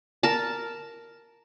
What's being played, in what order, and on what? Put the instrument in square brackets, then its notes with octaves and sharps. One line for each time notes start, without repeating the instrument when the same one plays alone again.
[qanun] A#4 A5